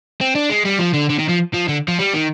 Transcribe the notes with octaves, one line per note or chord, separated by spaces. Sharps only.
C4
D4
G#3
G3
F3
D3
D3
D#3
F3
F3
D3
F3
G3
D#3